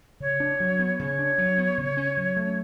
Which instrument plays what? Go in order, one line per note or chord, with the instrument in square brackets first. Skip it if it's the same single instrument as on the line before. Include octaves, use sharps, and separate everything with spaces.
[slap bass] C#3 [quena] C#5
[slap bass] D4
F#3
B3
[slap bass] C#3 [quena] C#5
[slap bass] D4
F#3
B3
C#3
C#4
F#3
A3